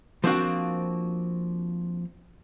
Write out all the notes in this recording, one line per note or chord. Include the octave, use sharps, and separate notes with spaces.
F3 A#3 C4 D4 F4 F#4